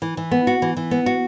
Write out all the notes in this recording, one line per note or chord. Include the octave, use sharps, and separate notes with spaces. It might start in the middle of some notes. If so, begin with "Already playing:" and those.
E3
E3
B3
F#4
E3
E3
B3
F#4